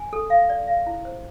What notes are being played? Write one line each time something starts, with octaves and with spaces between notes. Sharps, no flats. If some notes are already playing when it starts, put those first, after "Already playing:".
Already playing: G#5
A4
F5
D5
F5
E4
C5